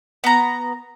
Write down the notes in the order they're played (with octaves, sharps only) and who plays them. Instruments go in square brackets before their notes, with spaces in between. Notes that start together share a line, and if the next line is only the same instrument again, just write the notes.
[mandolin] B3 A#5